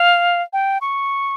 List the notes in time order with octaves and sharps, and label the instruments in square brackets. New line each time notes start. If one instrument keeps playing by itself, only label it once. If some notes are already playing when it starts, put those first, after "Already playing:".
Already playing: [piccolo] F5
G5
C#6